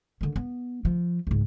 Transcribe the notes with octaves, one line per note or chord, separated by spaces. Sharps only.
D3 D#3
B3
F3
C#2 G#2